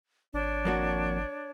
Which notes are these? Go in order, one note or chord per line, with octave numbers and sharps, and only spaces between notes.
G#1 D4 C#5
F2 A#3 F#4